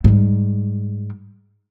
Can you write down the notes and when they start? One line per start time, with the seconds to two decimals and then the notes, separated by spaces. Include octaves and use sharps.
0.04 G#2 G3